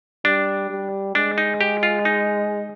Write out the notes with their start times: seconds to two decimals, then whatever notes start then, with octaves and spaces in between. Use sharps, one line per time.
0.25 G3 D4
0.70 G3
1.15 G#3 D4
1.38 D#4
1.61 G4
1.83 F4
2.05 D#4